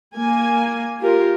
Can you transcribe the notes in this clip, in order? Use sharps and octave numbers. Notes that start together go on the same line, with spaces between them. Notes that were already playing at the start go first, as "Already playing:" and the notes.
A#3 G#5
F4 G4 A#4